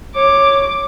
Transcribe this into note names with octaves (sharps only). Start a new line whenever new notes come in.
C#5 D6